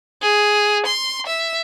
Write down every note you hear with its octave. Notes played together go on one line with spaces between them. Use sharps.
G#4
C6
E5